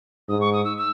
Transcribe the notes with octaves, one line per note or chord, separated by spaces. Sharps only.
G#2 D#6
C#6
D#6
E6
E6